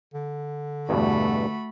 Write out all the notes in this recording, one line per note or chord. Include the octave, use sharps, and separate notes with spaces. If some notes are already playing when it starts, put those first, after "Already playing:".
D3
E2 G2 B2 A3 F#4 B5